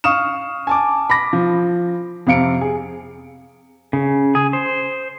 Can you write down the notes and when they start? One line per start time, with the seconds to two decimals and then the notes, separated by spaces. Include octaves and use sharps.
0.04 F5 C#6 D#6 F6 E7
0.67 G#5 A5 D6
1.10 B5 D6 A#6
1.33 F3
2.27 F2 C3 F5 C#7 D7
2.61 G#4
3.93 C#3
4.35 G#4
4.53 C5